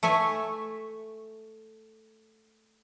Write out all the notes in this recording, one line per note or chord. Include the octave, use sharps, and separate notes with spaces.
A3 C#5 E5 G#5